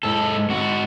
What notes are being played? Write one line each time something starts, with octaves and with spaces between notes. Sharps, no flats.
G#2 A4
G#2 F#4